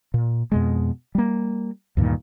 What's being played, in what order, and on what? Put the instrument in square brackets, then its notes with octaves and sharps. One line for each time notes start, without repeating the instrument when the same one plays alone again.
[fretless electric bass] A#2
F2 B2 G#3
G3 A#3
D2 G2 A#2 D#3